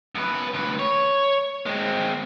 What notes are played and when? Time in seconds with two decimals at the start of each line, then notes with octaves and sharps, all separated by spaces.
0.15 F#2 B4
0.54 D2 B4
0.79 C#5
1.66 G#3 C4